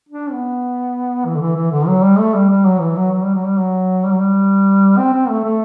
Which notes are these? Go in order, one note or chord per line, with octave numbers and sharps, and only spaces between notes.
D4
B3
E3
D3
E3
E3
D3
F#3
G3
A3
G3
G3
F#3
E3
F#3
F#3
G3
F#3
G3
F#3
G3
F#3
G3
C4
C4
A3
A3